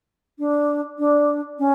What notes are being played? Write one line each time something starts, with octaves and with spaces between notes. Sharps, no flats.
D4
D4
C#4